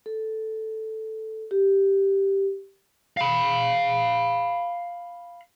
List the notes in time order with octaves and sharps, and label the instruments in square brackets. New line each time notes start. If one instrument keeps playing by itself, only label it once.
[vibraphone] A4
G4
[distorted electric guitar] F5 B5